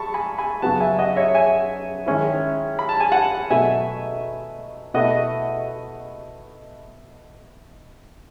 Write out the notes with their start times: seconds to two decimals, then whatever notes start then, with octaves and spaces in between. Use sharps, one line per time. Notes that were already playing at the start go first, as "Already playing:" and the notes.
Already playing: A5 B5 C#6
0.14 G#5 B5
0.38 G#5 B5
0.62 F#2 C#3 F#3 B3 F#5 A5
0.80 E5 G#5
0.99 D#5 F#5
1.16 C#5 E5
1.34 E5 G#5
2.06 D#3 G#3 C#4 E4
2.79 B5
2.89 A5
3.00 G#5
3.12 F#5 A5
3.50 B2 F#3 A3 E5 G#5
4.94 B2 A3 E4 D#5 F#5